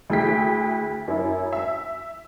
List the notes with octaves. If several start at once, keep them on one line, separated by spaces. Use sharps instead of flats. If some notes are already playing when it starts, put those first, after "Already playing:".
D2 E4 G#4 G5 B6
F#2 E4
E5